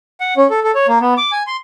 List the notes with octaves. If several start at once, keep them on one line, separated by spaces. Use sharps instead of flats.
F#5
C#4
A4
A4
C#5
A#3
B3
D6
G#5
C6